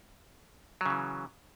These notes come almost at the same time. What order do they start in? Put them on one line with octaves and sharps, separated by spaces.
F#3 C#3 E3